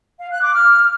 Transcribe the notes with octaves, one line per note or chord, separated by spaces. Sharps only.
F5
F#6
D6
F6